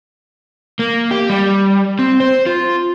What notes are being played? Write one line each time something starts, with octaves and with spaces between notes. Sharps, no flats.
A#3
G4
G3
C4
C5
F4